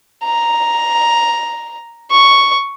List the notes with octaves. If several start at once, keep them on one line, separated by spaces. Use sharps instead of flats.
A#5
C#6